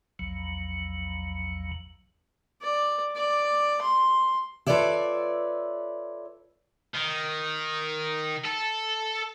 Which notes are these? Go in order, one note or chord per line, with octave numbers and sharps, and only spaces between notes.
A#1 E2 F#3
D5
D5
C6
F4 A4 B4 C#5 D5 E5
D#3
A4